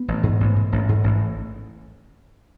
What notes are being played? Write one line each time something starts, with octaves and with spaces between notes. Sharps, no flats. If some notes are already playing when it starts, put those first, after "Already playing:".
Already playing: B3
A1
G#2
A1
G#2
A1
G#2
A1